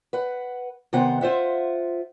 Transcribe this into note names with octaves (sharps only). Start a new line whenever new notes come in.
B4 F#5
C3 D#3 B3 C5 F#5
F4 C5 E5 F#5